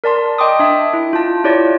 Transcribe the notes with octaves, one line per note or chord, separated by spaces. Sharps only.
A#4 D5 A5 C6
D#5 G5 C6 D6 D#6
D4 E5 A5
E4
F4 A5
E4 F4 G4 C#5 D5